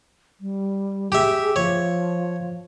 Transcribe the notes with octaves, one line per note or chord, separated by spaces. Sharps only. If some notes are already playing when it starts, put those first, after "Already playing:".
G3
G4 G#4 E5
F3 C#5